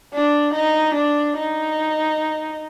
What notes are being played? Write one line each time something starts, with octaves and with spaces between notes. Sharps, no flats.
D4
D#4
D4
D#4